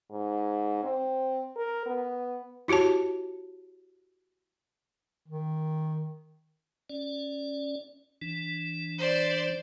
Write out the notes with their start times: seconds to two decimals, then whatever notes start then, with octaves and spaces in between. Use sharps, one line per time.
0.12 G#2
0.83 C4
1.56 A#4
1.86 B3
2.68 E4 F#4 G4 C#5 A5
5.27 D#3
6.89 C#4 D5
8.22 E3 D4
8.97 C5 D5